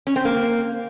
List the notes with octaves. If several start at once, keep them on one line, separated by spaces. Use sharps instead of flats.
C#4
C4
A#3